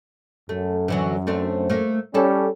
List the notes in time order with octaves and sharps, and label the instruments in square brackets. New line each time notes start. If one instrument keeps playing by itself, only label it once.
[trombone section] F#2 [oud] A3
[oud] D3 E3 F#3
A3 C4 D4
A3 A#3
[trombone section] G3 C#4 [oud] E4 A4